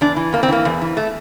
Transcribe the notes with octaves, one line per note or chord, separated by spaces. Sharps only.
E2 D4
E3
E2 A#3
C4
E3 A#3
E2
E3
A3